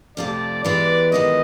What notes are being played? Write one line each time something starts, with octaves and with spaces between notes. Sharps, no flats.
F2 C3 F3 A3 D5
E3 G#3 B3 E4 G4 D5
D#3 G#3 B3 E4 G4 D#5